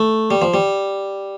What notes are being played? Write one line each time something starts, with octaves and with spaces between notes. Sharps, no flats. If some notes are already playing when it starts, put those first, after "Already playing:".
Already playing: A3
G3
F3
G3